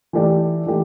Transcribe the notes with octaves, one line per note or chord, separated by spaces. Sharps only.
E3 A3 G4 D5
E3 A3 G4